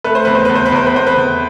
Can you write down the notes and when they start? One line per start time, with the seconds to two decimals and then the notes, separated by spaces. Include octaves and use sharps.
0.04 A3 B4
0.15 C5
0.25 E2 B4
0.35 C5
0.45 E2 B4
0.55 C5
0.66 B4
0.72 E2 C5
0.86 B4
0.95 E2 C5
1.06 B4
1.17 E2